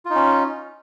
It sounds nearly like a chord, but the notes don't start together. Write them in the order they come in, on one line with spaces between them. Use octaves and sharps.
F4 D#4 C#4